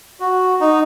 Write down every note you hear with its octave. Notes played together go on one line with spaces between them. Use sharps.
F#4
D#4